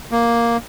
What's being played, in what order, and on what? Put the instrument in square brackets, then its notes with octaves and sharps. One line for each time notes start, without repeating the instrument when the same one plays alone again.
[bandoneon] A#3